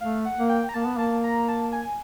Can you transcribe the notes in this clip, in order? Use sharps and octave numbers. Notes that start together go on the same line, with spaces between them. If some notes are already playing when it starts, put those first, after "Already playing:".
A3 F5
F#5
A#3
G5
A#5
A#3 A5
B3
A#3 A5
A#5
A5
G#5